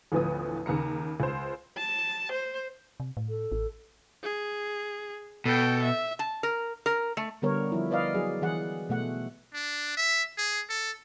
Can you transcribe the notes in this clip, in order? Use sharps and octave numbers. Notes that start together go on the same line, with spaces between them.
A1 D2 E3 F3 B3 D#6
D#2 C#3 A#5 C#7
C#2 C5
A5
C5
C3
A2
A4
A1
G#4
B2 A4 G5
E5
A5
A#4
A#4
A3
D3 G3 B3 A#4 C#5
F3 E4
B4 D5 D#5 F5
F#3 G#4
E3 G#4 F#5
B2 A3 F#5
D4
E5
G#4
A4